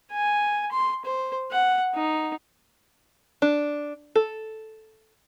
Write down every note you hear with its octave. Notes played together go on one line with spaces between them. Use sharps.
G#5
C6
C5
F#5
D#4
D4
A4